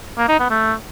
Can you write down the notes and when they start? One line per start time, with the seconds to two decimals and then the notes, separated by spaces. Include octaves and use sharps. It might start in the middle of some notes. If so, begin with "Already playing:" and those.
0.18 A#3
0.28 D#4
0.39 B3
0.50 A3